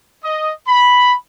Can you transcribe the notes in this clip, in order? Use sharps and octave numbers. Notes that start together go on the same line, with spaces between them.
D#5
B5